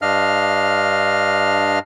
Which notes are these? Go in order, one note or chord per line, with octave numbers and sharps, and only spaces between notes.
G2 D4 D#5 F5 F6